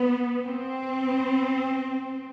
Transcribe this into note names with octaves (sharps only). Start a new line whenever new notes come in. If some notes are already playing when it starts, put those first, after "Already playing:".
Already playing: B3
C4